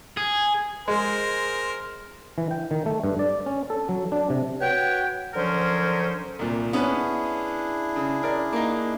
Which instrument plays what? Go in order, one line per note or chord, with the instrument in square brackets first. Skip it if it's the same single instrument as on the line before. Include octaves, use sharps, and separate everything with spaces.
[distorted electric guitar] G#4
[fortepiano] G#3 [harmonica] A#4 C5
[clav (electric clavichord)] E3
G5
D#3
A3
G2
D5
C#4
A4
F#3
D4
C3
[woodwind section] F#4 B4 C#5 G5
D3 F3 F#3 C#4 A#4 C5
[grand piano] C2 A#2
[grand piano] B3 C#4 B4 [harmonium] D4 E4 G#4
[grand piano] C#3
A#4 D5
A#3 D#4